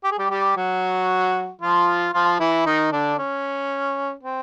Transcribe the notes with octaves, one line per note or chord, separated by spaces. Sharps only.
G4
G#4
G3 G4
G3 G4
F#3 F#4
F3 F4
F3 F4
E3 E4
D#3 D#4
D3 D4
C#4
C4